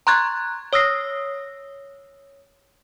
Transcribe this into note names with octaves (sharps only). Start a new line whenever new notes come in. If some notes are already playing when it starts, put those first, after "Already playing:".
A#5 C6 C#6 F#6 G#6 A6
C#5 D#6 E6 A#6 C7